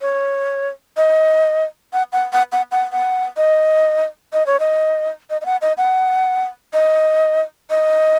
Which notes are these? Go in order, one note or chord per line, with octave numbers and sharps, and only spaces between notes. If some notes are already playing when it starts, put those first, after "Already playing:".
C#5
D#5
F#5
F#5
F#5
F#5
F#5
F#5
D#5
D#5
C#5
D#5
D#5
D#5
F#5
D#5
F#5
D#5
D#5